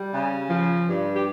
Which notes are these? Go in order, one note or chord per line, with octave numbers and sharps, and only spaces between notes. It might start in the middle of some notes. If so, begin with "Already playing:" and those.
Already playing: G3
C#3
F3
G2
G4